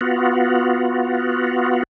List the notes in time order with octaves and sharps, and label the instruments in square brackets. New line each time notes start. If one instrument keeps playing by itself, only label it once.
[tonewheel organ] B3 F4 F#4